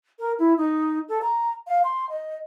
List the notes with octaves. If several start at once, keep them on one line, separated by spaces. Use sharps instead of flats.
A#4
E4
D#4
A4
A#5
F5
C6
D#5